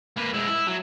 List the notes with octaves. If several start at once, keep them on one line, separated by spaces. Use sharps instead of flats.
A#3 B4
G#3 E4
E4
F#3